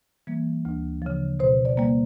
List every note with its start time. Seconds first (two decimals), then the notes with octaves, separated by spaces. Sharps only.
0.27 E3 G3 A#3
0.65 D2
1.02 C#3 F3
1.40 B2 C5
1.65 D5
1.77 G3 A#3